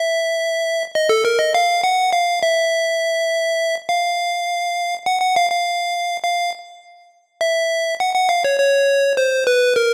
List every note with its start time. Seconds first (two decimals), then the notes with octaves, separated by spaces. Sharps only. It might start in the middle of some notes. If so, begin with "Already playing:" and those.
Already playing: E5
0.95 D#5
1.09 A4
1.25 A#4
1.39 D#5
1.54 F5
1.84 F#5
2.13 F5
2.43 E5
3.89 F5
5.06 F#5
5.21 F#5
5.36 F5
5.51 F5
6.24 F5
7.41 E5
8.00 F#5
8.15 F#5
8.29 F5
8.44 C#5
8.60 C#5
9.17 C5
9.47 B4
9.76 A#4